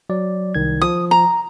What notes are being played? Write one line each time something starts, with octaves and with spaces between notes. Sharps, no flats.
F#3 D5
C2 D#3 G#6
F3 D#6
A#5